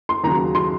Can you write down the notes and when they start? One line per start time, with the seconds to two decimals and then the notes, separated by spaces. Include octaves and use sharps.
0.09 C6
0.24 D#2 C#3 F#3 A#5
0.55 C6